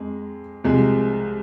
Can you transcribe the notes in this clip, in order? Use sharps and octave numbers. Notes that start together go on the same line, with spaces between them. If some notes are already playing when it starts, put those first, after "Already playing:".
Already playing: F2 G#3
C2 C3 F3 G#3